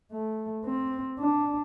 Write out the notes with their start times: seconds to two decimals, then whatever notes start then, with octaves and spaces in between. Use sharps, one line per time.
0.12 A3
0.65 C4
1.19 D4